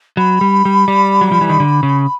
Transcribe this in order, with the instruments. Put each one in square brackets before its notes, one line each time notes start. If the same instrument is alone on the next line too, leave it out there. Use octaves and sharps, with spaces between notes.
[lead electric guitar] F#3 [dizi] B5
[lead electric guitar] G3
G3
G3
F#3
F3
E3
D#3
D3
C#3